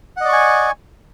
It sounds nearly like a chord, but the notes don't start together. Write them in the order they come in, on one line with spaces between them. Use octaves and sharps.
F#5 D#5 D5 C#6 G#5